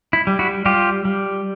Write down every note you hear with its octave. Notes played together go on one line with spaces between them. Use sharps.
E4
G3
E4 F#4
G3 F4 G4
G3